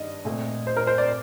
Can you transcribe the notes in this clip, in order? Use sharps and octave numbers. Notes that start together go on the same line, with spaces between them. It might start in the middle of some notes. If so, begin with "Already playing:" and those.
Already playing: G2 D#3 D4 D#5
A#2 A3 C4
C5
A#4
C5
D5